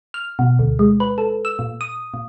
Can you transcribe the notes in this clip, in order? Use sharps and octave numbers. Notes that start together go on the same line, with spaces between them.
F6
B2
D2
G#3
B4
A4
E6
A#2
D#6
A#2